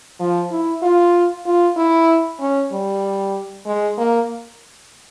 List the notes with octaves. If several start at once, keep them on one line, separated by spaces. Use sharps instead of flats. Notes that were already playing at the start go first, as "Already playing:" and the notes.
F3
E4
F4
F4
E4
C#4
G3
G#3
A#3